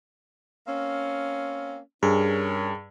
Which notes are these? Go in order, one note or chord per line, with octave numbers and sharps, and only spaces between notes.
A#3 C4 C#4
G2 C#4 G#4 A#4